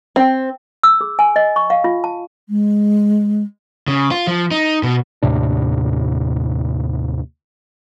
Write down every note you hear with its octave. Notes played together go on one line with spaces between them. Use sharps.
C4
E6
G#4
G#5
D#5
C#6
F5
F4
A5
G#3
C#3
F4
F3
D#4
B2
D#2 A2 C3 D4